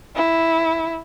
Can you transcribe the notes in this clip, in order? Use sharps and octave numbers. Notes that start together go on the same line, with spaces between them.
E4